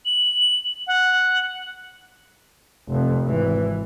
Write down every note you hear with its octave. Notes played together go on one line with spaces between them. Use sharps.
F#7
F#5
F1 F2
G#1 E3